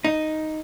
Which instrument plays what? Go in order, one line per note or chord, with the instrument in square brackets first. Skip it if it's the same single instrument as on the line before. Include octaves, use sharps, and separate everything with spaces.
[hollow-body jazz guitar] D#4